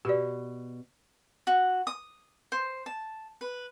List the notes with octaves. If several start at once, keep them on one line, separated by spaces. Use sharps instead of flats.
B2 G4 D5
F#4
D#6
C5
A5
B4